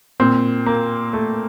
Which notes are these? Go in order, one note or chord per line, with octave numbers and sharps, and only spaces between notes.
A#2 C4
A#3
A3